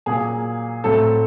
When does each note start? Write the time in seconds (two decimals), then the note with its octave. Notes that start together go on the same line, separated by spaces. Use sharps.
0.06 A#2 F#3 A#3 G#4
0.84 A2 F#3 A3 C4 A4